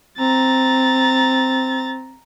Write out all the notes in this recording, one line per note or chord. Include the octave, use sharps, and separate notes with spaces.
C4 A#5 A6